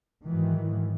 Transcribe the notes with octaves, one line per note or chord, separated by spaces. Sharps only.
G#2 D#3 E3 F#3